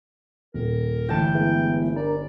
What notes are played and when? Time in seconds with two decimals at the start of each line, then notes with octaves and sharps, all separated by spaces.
0.54 D#1 A#4
1.09 G1 E3 A3 A4 G5 A5 C#7
1.35 G#3 B3 E4
1.96 D4 A#4 D5